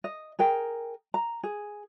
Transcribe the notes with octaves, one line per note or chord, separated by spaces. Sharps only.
D#5
G#4 A#4 G5
A#5
G#4